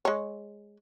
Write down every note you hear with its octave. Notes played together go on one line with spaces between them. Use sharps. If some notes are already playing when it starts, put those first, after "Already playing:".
G#3 C#5